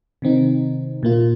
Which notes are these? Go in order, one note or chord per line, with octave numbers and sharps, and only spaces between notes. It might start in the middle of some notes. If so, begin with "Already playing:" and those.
C3 D#3 C4 D#4
A#2 A#3 F4